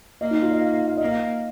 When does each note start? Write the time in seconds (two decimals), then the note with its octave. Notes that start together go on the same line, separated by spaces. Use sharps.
0.21 A#3 D#5
0.31 D#4
0.41 F4
0.51 D#5
0.61 F5
0.74 F5
0.87 F5
0.97 A#3 D#5
1.08 F5